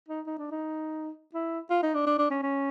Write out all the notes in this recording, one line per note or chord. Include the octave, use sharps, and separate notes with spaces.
D#4
D#4
D4
D#4
E4
F4
D#4
D4
D4
D4
C#4
C#4